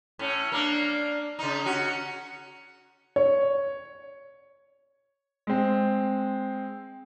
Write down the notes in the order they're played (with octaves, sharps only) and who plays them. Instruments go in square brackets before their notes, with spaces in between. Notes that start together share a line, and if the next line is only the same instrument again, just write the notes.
[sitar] A2 C#4
A#3 D4
C#3 D#4
C#4 F#4
[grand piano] C#5
G#3 C4